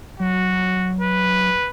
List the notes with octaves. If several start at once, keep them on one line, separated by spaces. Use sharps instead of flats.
F#3 F#4
B4